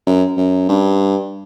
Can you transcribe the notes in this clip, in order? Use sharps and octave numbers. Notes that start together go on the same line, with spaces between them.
F#2
F#2
G2